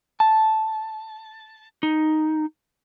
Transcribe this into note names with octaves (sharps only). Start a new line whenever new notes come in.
A5
D#4